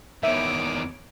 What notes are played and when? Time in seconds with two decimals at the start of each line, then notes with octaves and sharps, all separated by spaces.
0.23 E2 D#3 C#5 E5 D6